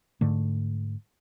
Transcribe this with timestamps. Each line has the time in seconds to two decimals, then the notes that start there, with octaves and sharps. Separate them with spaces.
0.21 G#2 D3 A3